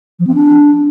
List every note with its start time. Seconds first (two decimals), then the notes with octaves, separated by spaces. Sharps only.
0.19 F3
0.27 C4
0.34 D4